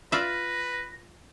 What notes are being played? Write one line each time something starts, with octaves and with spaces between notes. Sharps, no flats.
F4 B4 D5 E5 A#6